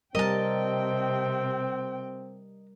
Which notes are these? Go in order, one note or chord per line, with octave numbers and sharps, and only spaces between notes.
C3 G3 C4 A#4 D#5 G5 A5